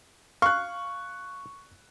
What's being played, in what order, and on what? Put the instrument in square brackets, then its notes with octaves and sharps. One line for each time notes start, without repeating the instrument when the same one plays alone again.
[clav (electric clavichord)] F5 [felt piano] C#6 F#6